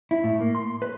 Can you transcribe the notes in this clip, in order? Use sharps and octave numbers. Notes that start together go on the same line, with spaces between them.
E4
A2
A#3
C6
B4